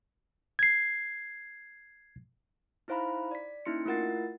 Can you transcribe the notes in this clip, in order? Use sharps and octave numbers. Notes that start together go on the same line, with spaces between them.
G#6 C7
D#4 E4 C5 F5 A#5 B5
D5 B6
A#3 C#4 D#4 E4 C6 C#7
A3 E4 F4 A#4 F#5 A6